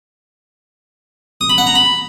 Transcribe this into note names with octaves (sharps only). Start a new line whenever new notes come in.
D#6
B5
F#5
A#5
B5